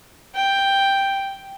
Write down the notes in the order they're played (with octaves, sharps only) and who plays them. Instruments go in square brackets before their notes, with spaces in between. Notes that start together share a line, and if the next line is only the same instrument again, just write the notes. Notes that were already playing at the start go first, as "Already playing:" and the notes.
[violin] G5